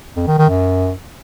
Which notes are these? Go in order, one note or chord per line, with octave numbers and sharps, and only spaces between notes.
F2
D#3
D#3
F#2